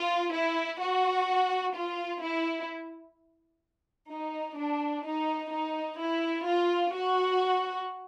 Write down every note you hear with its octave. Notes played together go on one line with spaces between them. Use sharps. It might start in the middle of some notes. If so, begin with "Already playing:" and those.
Already playing: F4
E4
F#4
F4
E4
D#4
D4
D#4
D#4
E4
F4
F#4